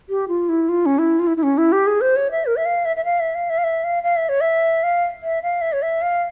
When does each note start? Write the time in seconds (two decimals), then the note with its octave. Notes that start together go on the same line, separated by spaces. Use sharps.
0.09 G4
0.28 F4
0.49 E4
0.69 F4
0.86 C#4
0.98 E4
1.19 F4
1.27 E4
1.37 E4
1.43 C#4
1.58 E4
1.72 G4
1.87 G#4
2.01 C5
2.16 C#5
2.31 E5
2.46 A#4
2.56 E5
2.65 F5
2.85 E5
2.96 E5
3.05 F5
3.20 E5
3.35 F5
3.50 E5
3.58 F5
3.64 E5
3.84 F5
4.03 F5
4.16 E5
4.29 C#5
4.41 E5
4.83 F5
5.23 E5
5.42 F5
5.61 E5
5.73 C#5
5.82 E5
6.02 F5